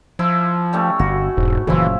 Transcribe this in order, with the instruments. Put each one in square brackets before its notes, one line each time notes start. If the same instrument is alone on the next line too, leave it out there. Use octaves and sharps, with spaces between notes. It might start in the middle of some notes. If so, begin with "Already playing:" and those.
[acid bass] F3 [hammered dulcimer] E4
[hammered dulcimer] G3 A3 C#4
[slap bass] G1 [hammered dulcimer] F#4
[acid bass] E1 [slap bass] G#2
[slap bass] F#1 A#2 C#3 [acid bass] E3 [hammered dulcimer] F3 E4